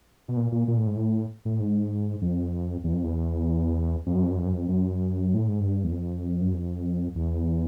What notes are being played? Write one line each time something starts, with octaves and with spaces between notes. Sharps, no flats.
B2
A#2
A#2
A#2
A2
G#2
A2
A2
G#2
F2
E2
F2
E2
F2
F#2
F2
F#2
F2
F#2
F2
F#2
A2
G#2
G2
E2
F2
F#2
F2
E2